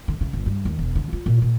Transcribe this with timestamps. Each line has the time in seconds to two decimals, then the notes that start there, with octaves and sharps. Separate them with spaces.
0.08 D3
0.21 C#3
0.33 G1
0.46 G2
0.65 D#2
0.79 E1
0.95 D3
1.13 F4
1.26 A#2
1.42 A#2